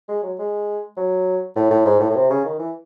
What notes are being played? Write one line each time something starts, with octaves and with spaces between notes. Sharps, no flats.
G#3
F#3
G#3
F#3
A2
A2
G#2
A2
A2
C3
C#3
D#3
E3